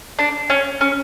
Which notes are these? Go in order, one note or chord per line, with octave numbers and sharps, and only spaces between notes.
D4
C#4
C#4